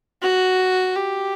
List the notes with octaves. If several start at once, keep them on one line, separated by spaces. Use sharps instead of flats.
F#4
G4